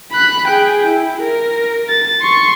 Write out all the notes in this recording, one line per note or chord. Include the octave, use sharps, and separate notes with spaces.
B5 F#6
G#4 G5
E4
A#4
A6
C6 C#6